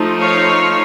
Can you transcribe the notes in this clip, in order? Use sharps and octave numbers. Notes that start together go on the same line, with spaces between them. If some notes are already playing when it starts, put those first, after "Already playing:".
Already playing: F3 A3 D#4
C#5 F5